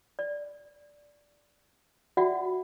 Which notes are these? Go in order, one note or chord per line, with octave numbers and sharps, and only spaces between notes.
D5
F4 F#4 D5 E5 F#5 G5